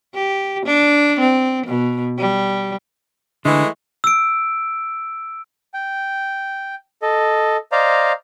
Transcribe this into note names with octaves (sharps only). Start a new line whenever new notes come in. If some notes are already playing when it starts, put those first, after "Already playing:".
G4
D4
C4
B2
G3
D3 E3 G#3 A3
E6 D7
G5
A4 D#5
C5 D5 D#5 F5 A#5